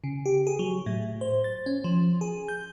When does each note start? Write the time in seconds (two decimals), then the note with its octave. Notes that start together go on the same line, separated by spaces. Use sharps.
0.04 C#3
0.26 G4
0.47 G#4
0.59 F#3
0.86 A2
1.21 C5
1.44 A6
1.66 C#4
1.84 F3
2.21 G#4
2.48 G6